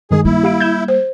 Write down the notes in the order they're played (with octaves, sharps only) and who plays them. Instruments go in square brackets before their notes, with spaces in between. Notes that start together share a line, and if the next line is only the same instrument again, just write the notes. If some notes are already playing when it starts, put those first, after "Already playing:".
[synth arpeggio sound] G2 D#3 G#3 [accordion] G#4
[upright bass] G3 A#3 [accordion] E4
[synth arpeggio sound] G4 F5 D7
G6 G#6 E7
[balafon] C5